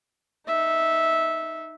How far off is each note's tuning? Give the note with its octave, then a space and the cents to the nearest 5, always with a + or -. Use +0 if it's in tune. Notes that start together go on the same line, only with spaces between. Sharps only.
D#4 +0 E5 -10